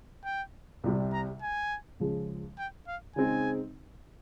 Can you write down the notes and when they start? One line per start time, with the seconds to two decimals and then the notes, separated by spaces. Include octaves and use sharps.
0.25 G5
0.84 C2 C3 G3
1.12 A#5
1.42 G#5
2.00 C#2 C#3 F3 G#3
2.59 G5
2.88 F5
3.16 C#3 G#3 C4 D#4 G#5